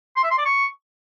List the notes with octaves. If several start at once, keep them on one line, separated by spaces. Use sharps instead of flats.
C6
E5
C6
D5
C#6